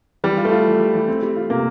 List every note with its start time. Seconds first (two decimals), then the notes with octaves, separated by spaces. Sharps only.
0.24 E3 G3
0.37 F4
0.45 A3
0.52 F4
0.66 E3
0.79 G3
0.93 E3
1.08 C4
1.22 G3
1.36 F4
1.50 C3 A#3